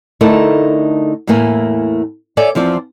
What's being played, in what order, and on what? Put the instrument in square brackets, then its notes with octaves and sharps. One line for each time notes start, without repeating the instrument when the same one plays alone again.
[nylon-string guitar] D3 A3 D#4 E4 A4 A#4
E2 A2 A3 A#3 E4 G#5
A4 C#5 D5 E5 G#5
E2 F3 C4 D5